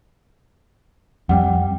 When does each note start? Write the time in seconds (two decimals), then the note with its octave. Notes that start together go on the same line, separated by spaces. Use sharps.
1.29 F2 G3 F#5 G5